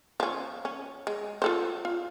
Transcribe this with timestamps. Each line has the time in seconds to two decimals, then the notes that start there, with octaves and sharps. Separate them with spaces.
0.20 F3 C#4
0.65 C#4
1.07 G#3
1.42 F4 A4 C5
1.85 F4